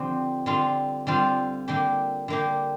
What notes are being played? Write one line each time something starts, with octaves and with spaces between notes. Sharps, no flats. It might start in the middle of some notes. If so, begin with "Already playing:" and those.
Already playing: D3 F3 C4 G4
D3 G3 C4 F4
D3 G3 C4 F4
D3 A#3 G4
D3 A#3 G4